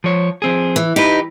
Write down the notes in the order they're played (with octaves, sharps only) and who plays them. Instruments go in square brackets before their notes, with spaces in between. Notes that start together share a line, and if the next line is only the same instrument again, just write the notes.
[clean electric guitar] F3 C#5
F3 C4 G#4
[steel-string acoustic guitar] E3
[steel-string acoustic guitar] D#4 [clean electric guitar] G4 B4